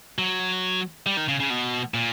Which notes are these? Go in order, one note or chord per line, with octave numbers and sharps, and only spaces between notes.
F#3
G3
D#3
C#3
C#3
B2
A#2